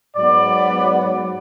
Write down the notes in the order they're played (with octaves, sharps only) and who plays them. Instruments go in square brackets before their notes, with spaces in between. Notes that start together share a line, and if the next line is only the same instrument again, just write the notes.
[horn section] G#2 F#3 B3 D5